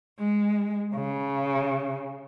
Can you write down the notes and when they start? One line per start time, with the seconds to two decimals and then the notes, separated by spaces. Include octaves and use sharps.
0.19 G#3
0.95 C#3